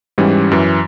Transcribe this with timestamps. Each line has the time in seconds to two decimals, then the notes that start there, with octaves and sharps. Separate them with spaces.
0.18 G#2 E3 G3 C#4
0.51 F#2 E3